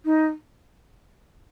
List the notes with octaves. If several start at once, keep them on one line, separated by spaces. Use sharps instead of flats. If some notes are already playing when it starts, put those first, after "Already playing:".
D#4